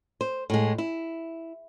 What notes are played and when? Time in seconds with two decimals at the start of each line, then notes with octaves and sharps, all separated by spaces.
0.21 C5
0.50 A2 G#3
0.78 E4